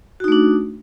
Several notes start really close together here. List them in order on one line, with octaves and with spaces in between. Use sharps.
F#4 D#4 A3 D4